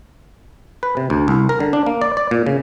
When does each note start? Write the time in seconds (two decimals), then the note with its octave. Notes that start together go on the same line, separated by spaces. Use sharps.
0.83 B4
0.97 C3
1.10 D2
1.28 C2
1.49 A#4
1.60 D3
1.73 D4
1.86 A#3
2.01 D5
2.17 D5
2.31 A#2
2.46 C#3